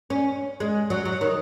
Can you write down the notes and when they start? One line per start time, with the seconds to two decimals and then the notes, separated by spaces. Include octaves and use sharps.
0.10 C#4
0.60 G#3
0.90 F#3
1.05 F#3
1.21 D#3